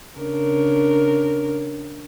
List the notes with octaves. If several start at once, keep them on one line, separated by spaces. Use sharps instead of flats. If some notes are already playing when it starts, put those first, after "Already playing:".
C#3 D4 A#4